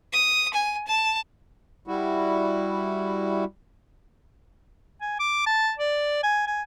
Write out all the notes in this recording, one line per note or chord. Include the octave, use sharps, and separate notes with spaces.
D#6
G#5
A5
G3 E4 F#4
G#5
D6
A5
D5
G#5
G#5